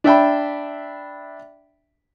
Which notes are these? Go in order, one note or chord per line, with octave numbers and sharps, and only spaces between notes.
D4 E5 G5 B5